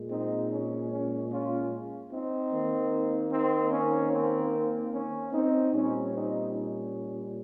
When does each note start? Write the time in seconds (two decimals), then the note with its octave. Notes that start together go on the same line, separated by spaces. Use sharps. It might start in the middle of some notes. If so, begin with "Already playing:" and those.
Already playing: A#2 G#3
0.09 C4 D#4
0.49 C#4
0.89 C#4
1.30 C#4 F4
2.10 C4 D#4
2.50 D#3 A#3
3.31 C4 D#4
3.71 C#4
4.11 C4
4.51 C4
4.92 C#4
5.32 C4 D#4
5.72 A#2 G3 C4 C#4
6.13 C4 D#4
6.53 C#4